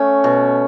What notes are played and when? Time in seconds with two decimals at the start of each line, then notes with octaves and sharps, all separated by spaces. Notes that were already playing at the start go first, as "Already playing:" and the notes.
Already playing: A3 C#4
0.24 B2